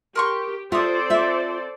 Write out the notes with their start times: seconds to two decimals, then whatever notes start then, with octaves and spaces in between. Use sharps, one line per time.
0.15 G4 A#4 C6 C#6
0.72 C4 F4 A4 C5 D5 E5 D#6
1.10 F4 E5